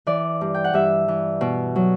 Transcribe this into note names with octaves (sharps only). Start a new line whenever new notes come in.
E3 D5
G2
G5
F#5
G2 E5
E3
B2
F#3